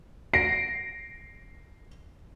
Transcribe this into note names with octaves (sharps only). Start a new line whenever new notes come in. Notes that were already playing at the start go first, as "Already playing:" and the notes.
A#6 C7 D7